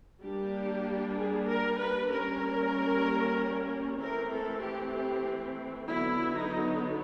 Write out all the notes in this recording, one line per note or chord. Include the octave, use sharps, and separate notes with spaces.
G3 A#3 D4 G4
G#4
A#4
B4
G3 A#3 C#4 A#4
E3 A3 C4 A#4
A4
G4
G4
D3 F#3 B3 E4
D#4